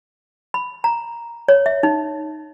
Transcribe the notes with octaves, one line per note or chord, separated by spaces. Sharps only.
B5
A#5
C#5
E5
D#4